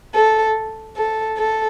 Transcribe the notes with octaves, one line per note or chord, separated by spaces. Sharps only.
A4
A4
A4